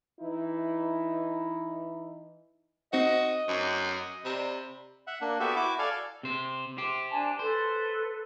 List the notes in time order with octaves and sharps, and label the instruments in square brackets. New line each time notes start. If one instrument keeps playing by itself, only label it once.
[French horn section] E3 D#4 E4
[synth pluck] C4 D#4 C5 [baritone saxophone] F#4 [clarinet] D#5
[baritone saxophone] F#2 [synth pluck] C#6 D6 E6
[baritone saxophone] C3 [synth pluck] D5 A#5 B5
[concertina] E5 F#5
A#3 D4
B3 F#4 G4 A4 E5
E4 F#4 D6
A4 D5 F5 G#5
[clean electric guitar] C3 C5
G4 C5
[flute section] D4 G#5 A5
[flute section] A4 B4 [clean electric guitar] C5